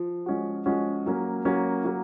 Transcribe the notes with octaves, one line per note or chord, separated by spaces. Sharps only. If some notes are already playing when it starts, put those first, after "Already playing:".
Already playing: F3
F3 G#3 C#4 F#4
F3 G#3 C#4 F#4
F#3 A#3 C#4
F#3 A#3 C#4
F#3 A#3